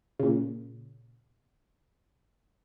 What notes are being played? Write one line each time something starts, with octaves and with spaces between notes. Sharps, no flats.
A#2 C#3